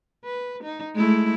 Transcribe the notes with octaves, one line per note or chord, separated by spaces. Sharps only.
B4
D#4
G#3 A3 E4